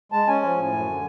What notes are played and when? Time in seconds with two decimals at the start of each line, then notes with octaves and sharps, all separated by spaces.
0.12 G#3 A5
0.28 C#4 G#5
0.42 F3
0.58 A2
0.72 F#2
0.87 D3